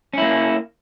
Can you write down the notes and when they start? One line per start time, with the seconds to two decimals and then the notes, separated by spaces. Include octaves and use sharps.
0.13 C#4
0.18 E4
0.22 A#3